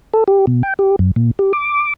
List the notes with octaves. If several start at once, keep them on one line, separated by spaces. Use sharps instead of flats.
A4
G4
B2
G5
G4
F#2
A#2
G4
D6